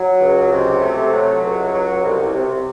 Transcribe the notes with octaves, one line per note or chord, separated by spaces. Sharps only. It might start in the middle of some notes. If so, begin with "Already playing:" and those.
Already playing: F#3
C#2
C3
A3
F#3
C#2
F#3
C2
C3